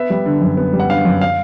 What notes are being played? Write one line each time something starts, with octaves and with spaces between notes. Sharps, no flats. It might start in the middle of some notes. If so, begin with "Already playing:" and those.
Already playing: B3 E5
G3
D3
F#2
B3
G3
F#5
D3 F5
F#2
F5